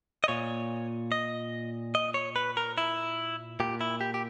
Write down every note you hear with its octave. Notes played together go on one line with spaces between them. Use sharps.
D#5
A#2 C#5
D#5
D#5
C#5
B4
A#4
E4
A#2 G4
E4
G4
G4